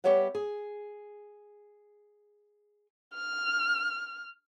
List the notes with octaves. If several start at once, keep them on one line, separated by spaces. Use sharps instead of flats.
G3 B3 G4 C#5 E5 F#5
G#4
F6